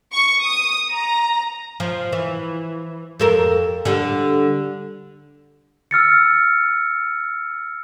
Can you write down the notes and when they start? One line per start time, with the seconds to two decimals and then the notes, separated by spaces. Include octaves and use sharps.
0.12 C#6
0.42 D#6
0.92 A#5
1.80 F3
2.12 E3
3.20 F2 A4 A#4
3.85 D3 G3
5.91 E6 F6 A6 C#7